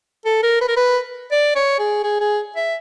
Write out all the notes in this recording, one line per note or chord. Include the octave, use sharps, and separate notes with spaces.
A4
A#4
B4
A#4
B4
D5
C#5
G#4
G#4
G#4
E5